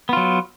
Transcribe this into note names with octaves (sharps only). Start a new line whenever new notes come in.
F#3 B3 F4